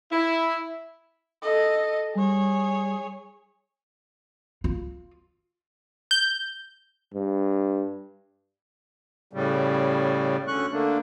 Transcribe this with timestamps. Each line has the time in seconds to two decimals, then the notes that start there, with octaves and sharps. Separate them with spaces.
0.11 E4
1.42 A4 D#5
2.15 G3 G#4 C#5
4.64 F4
6.11 G6
7.14 G2
9.33 A2 C#3 G3
10.48 D2 D3 C#4 C#6 F#6
10.72 D3 A3 A#3 D4